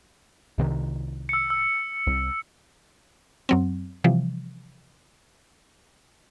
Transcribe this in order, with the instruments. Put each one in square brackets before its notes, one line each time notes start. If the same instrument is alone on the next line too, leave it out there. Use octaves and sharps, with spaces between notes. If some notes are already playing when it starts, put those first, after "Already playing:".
[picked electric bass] C2 C3 D#3
[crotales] E6 C#7
E6
[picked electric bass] C2
[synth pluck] F#2 F#3 C4
C3 E3 F3 G3